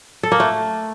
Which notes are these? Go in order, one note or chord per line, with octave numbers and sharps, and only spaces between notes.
A4
A#3
A3